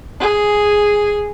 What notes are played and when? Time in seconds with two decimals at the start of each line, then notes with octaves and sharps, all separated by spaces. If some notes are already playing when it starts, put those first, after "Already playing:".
0.20 G#4